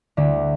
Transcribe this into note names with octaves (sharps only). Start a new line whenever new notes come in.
D2 D3